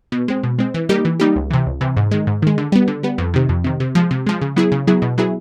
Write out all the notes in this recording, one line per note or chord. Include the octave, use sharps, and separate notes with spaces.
B2
G#3 C4
B2
G#3 C4
E3
G3 A#3 D#4 G4
E3
G3 A#3 D#4 G4
C#2
C3 E3
C#2
C3 E3
G#2
D#3 G#3
G#2
D#3 G#3
D3
G3 B3
D3
G3 B3
F2
C3 D#3
F2
C3 D#3
C3
F3 G#3
C3
F3 G#3
C#3
F#3 B3 E4 G#4
C#3
F#3 B3 E4 G#4
B2
F#3 B3 E4 G#4